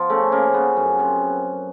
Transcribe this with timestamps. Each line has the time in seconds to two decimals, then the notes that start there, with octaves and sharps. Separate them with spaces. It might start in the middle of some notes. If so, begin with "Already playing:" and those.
Already playing: F3 B3
0.10 C#3 A3
0.32 C#3 A#3
0.54 C#3 B3
0.77 F#2
0.99 C3